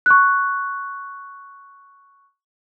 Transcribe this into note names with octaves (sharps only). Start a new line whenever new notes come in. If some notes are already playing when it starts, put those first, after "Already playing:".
C#6 F#6